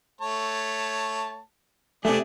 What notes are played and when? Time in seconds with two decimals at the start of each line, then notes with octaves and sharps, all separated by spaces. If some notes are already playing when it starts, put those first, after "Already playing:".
0.21 A3 C#5 A5
2.05 C3 A3 D4 G#4 D5